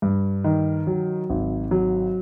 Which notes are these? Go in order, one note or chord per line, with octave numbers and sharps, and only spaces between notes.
G2
D#3
F#3
G#1
F#3